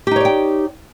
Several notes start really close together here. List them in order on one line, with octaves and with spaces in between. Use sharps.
G4 D#4 C#5 D5 G5